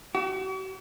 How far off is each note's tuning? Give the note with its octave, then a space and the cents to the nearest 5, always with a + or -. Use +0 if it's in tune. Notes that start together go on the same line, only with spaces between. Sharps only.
F#4 +45